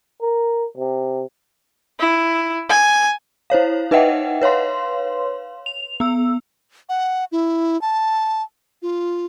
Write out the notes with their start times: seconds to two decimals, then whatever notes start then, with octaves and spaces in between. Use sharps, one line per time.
0.22 A#4
0.77 C3
1.99 E4
2.69 G#5
3.50 E4 C5 C#5 F5
3.91 D#4 B4 D#5 E5 F#5 G5
4.42 B4 C#5 F5 C6
5.66 F7
6.00 B3 E6
6.89 F#5
7.32 E4
7.81 A5
8.82 F4